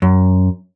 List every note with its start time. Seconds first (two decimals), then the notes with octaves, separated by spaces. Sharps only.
0.02 F#2